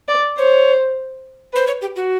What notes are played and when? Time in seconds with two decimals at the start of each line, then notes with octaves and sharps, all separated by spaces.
0.08 D5
0.38 C5 C#5
1.53 B4 C5
1.67 C#5
1.81 G4
1.96 F#4